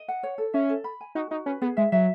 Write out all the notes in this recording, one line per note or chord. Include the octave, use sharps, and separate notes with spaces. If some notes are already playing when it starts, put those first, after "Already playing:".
Already playing: D#5
F#5
C#5
A4
C#4 E5
A4
B5
G#5
D#4 F#4
D#4 F#4
C#4 B4
B3 G#4
G#3 E5
F#3 E5